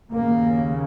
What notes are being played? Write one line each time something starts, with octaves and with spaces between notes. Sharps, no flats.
D#2 C#3 A#3